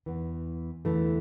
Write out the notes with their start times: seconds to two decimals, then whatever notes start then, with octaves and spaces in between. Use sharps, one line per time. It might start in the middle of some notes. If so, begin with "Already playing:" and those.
0.06 E2 E3
0.85 E2 D3 E3 A3